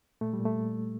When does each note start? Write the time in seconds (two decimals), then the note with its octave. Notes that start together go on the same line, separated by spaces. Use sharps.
0.21 A#2 A3
0.33 G3
0.39 A#2
0.45 A3
0.56 A#2
0.74 A#2